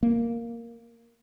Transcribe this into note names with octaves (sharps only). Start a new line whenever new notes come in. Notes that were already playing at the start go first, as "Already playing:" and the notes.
A#3